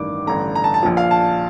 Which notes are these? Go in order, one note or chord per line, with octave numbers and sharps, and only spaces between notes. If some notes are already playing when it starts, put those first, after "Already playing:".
Already playing: A1 G2 D#3 D6
A1 G2 D3 A#5
A#5
A5
A5
A#1 A#2 F3
F5
A5